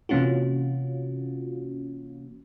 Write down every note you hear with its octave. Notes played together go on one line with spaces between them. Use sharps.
C3 E3 A#3 C#4 F4 F#4